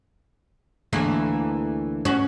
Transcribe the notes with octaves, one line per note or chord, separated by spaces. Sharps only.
D2 E3 A#3
C#4 F#4